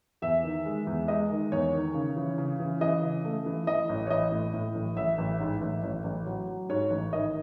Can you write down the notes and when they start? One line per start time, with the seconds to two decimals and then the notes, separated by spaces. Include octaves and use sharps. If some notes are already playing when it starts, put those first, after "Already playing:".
0.22 E2 E5
0.44 D#3
0.66 G#3
0.87 E2
1.08 G#3 D#5
1.30 D#3
1.52 E2 C#5
1.73 D#3
1.95 C#3
2.16 E3
2.38 C#3
2.60 E3
2.81 E3 D#5
3.03 C#3
3.25 A3
3.46 E3
3.67 E3 D#5
3.89 A1
4.07 C#5
4.10 E3 D#5
4.32 A2
4.54 A2
4.75 A1
4.96 A1 E5
5.18 A1
5.40 G#2
5.61 A1
5.83 A1
6.04 A1
6.26 F#3
6.48 F#3
6.69 G#2 C#5
6.91 A1
7.13 D#3 D#5